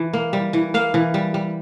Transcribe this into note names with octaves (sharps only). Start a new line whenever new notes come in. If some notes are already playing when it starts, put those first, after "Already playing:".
Already playing: E3
A#3
G3
E3
A#3 F5
E3
G3
G3